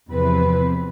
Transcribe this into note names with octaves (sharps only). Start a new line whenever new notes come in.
E2 C3 F3 C4 B4